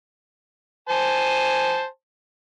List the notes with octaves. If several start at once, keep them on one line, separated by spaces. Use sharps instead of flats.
C5 G#5 A5